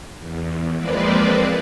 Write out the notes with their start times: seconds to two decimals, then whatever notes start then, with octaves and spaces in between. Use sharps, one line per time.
0.18 E2
0.77 F3 G#3 A#3 C4 B4 D5